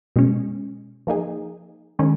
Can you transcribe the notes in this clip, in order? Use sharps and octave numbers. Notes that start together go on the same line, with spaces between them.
B2 G#3 C#4
F3 A#3 D#4 G#4
D#3 G#3 C#4